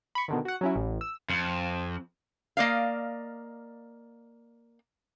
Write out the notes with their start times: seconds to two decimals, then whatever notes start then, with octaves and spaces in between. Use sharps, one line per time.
0.15 B5 C#6
0.28 B2 D3 D#3
0.45 F#4 F#5
0.61 F#3 C#4 E4
0.76 A1
1.01 E6
1.30 F2
2.57 A#3 D5 D#5 F5